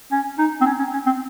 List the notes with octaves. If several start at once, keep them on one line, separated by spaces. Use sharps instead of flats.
C#4
D#4
C4
C#4
C#4
C#4
C4